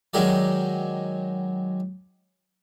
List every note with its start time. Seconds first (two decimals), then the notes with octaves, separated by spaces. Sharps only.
0.14 D#3 F#3 G#3 G4 A#4 D5